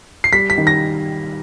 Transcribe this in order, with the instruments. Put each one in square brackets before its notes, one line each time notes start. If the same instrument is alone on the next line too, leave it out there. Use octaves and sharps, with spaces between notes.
[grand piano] C7
[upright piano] G3 [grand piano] B6
[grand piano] B6
[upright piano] D#3
[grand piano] A#6